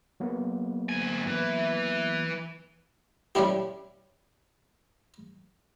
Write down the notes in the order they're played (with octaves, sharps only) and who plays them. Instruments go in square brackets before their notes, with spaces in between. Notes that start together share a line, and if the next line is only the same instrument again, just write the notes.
[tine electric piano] F#3 A#3 B3
[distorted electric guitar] D2 G#5
E3 B4
[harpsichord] G3 C#4 D4 E4 G4